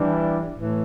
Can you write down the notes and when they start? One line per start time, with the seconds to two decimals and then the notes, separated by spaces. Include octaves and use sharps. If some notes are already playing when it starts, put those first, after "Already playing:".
Already playing: E3 G3 D4
0.53 A2 E3